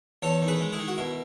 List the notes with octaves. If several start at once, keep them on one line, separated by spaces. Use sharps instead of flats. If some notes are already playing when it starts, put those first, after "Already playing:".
E2 A4 C#5
D#3
G#4 B4
G#3
E4 G#4
D#3
F#4
B2 E4